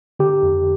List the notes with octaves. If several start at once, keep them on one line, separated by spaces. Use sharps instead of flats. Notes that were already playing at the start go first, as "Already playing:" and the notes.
D3 G4
F2